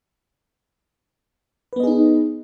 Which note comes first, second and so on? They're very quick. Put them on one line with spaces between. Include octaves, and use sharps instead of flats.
B4 B3 D#5 G#4 D#4